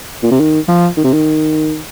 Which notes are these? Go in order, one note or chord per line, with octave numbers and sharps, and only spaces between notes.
A#2
C3
D#3
F3
D#3
C3
D#3